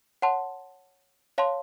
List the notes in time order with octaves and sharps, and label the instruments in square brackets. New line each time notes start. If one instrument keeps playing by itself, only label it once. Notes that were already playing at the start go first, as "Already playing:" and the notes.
[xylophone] C#5 F#5 A5 C6
C#5 F5 A5 C6